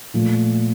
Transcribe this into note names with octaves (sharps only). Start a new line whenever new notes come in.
A#2 F3 A3